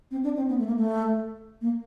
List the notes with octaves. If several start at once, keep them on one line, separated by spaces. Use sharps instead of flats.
C4
D4
C4
B3
A3
A#3
A3
A#3